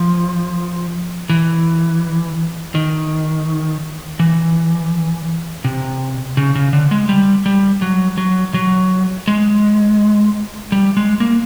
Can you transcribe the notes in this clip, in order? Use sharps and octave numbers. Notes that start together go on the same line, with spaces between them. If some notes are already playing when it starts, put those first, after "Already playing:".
Already playing: F3
E3
D#3
E3
C3
C#3
C#3
D3
G#3
G3
G3
F#3
F#3
F#3
G#3
G3
G#3
A#3